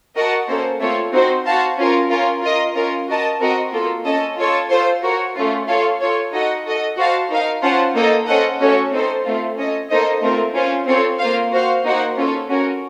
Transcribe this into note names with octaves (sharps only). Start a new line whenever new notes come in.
F#4 A#4 D#5 F#5 A5
A#3 C#4 A4 C5
A3 C4 F4 A4 C#5
C4 D#4 F#4 C5
F#4 C5 F5 A5
C#4 F4 A#4
C#4 F4 A#4
F4 A#4 D#5
C#4 F4 A#4
F#4 A#4 D#5 A5
C4 F#4 A#4 D#5
A#3 F4 A4
C#4 A4 D#5 A5
F4 A4 C#5 A5
F4 A4 C5
F#4 A#4 C#5
A3 C#4 F4
F4 A4 C#5 F5
F4 A4 C#5
D#4 F#4 A4 D#5 F#5
F#4 A4 D#5
F#4 C5 F5 A5
D#4 A#4 F5
C#4 F4 C5 F#5 A5
A#3 D#4 A4 D#5
C#4 A4 C5 D#5 F#5
A3 C#4 F#4 A4 C#5
C4 D#4 A4 C5
A3 C4 F4
C#4 A4 D#5
A#3 D#4 A4 C5 D#5
A3 C4 F4 A#4
C#4 F4 C5
C4 F4 A4 C#5
A#3 F4 C5 F5
F#4 C5 F5
A#3 D#4 F#4 C5 F#5
C#4 F4 A4 C#5
C#4 F#4 A#4